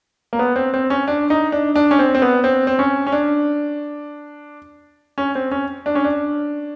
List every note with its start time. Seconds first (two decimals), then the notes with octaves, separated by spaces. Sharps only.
0.33 A#3
0.39 B3
0.56 C4
0.74 C4
0.90 C#4
1.08 D4
1.30 D#4
1.52 D4
1.76 D4
1.91 C#4
1.99 C4
2.15 C4
2.22 B3
2.44 C4
2.67 C4
2.79 C#4
3.07 C#4
3.12 D4
5.18 C#4
5.35 C4
5.51 C#4
5.86 D4
5.95 C#4
6.04 D4